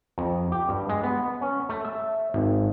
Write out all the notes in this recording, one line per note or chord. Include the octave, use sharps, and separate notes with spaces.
F2
G4
G2
G#3
B3
C#4
A3
E5
G#1